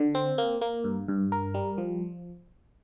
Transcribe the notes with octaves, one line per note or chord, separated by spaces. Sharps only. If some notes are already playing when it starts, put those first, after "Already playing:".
Already playing: D3
C4
A#3
A#3
G2
G2
A#4
G3
F3